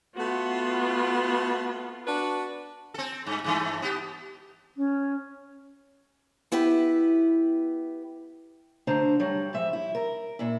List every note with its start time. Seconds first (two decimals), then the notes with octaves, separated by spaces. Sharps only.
0.17 A3 B3 F4 F#4
2.07 D4 F#4 B4
2.94 C4 A4
3.26 G2
3.44 G2 E3 A3
3.82 B3 G4
4.76 C#4
6.52 B3 E4 G4 B4
8.87 D2 D3 D4 C5 A#5
9.20 G2 F#3 G3
9.53 G#2 F3 E5
9.73 E4
9.95 A#4
10.39 A#2 E4